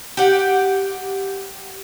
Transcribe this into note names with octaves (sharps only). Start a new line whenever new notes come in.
G4 F#5